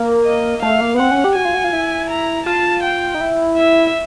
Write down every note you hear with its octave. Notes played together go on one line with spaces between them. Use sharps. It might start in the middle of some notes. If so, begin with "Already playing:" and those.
Already playing: A#3
D#5
A3 F5
A#3
B3
C4 F#5
C#4
G4
F#4 G#5
F4
F#4
F4
E4
A#5
F4 A5
G5
D#4
E4
E5